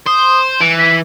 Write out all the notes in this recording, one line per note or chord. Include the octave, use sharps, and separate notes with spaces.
C5 D#6
E3 D7
B6